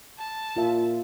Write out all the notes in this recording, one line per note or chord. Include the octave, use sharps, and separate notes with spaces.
A5
A#2 F4 E5